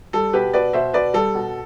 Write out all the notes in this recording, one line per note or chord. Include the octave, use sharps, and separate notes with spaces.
G3 A4
B2 G4 B4
B2 B4 D5
B2 C5 E5
B2 B4 D5
G3 A4
B2